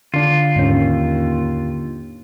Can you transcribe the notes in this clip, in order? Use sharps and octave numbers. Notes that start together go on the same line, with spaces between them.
D3 D4 F4
D#2 G#2 C#4